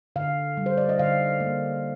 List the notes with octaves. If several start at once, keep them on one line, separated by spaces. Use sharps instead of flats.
D3 F5
G3
C5
D5
D#5
D3 F5
A#3